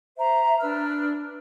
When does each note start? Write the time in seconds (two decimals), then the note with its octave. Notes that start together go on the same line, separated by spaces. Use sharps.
0.18 C5 E5 A#5
0.60 D4 B4 E6 F6